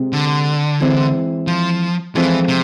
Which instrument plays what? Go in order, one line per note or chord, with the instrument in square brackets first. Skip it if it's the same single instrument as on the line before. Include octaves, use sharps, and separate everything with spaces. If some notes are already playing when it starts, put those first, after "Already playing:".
Already playing: [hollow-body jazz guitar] C3 G#3 C4
[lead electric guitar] D3
[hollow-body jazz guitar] E3 G#3 C4 E4
[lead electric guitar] F3
[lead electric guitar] E3 [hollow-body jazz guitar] F3 G#3 C4 F4 A4
[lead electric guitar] C3